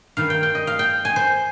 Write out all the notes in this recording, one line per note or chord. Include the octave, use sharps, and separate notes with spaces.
G2 D#3 G3 F5
G5
G5
D#5
F5
G5
G#5
C5